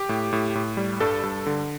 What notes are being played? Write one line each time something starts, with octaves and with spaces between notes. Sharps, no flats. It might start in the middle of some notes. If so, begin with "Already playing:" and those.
Already playing: G4
A2
A2
A2
G3
G2 A4
G2
D3